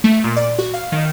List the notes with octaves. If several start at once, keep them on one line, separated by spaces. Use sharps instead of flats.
A3
A#2
D5
F#4
F5
D#3